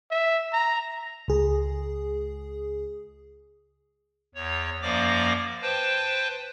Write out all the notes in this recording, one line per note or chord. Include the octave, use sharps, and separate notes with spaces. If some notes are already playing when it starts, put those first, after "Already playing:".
E5
A#5
C#2 G#4
E2 C#5
F#2 F3 A#3 D5 D6 A#6
B4 C5 G5 A5